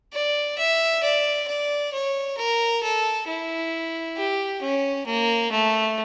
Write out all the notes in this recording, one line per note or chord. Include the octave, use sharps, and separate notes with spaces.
D5
E5
D5
D5
C#5
A#4
A4
E4
G4
C#4
A#3
A3